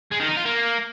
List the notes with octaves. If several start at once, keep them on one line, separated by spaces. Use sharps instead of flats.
G#3
D#3
D#4
F4
A#3